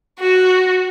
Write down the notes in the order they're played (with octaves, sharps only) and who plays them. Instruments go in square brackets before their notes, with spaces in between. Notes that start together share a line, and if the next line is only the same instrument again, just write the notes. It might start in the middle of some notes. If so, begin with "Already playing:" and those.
[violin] F#4